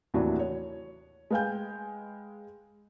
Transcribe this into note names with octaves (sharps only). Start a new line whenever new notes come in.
D#2 A2 C3 E3 F#3 D4
C#5
G#3 B4 F5 G5 G#5 G6